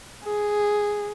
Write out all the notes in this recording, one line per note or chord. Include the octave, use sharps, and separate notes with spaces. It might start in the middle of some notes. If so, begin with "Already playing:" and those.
G#4